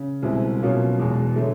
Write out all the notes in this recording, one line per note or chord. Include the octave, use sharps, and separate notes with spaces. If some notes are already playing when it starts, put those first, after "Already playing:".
Already playing: C#3
C2 B2 G#3 C4 E4
B2 F#3 A#3 C#4 F4
E2 B2 G#3
D3 F#3 A3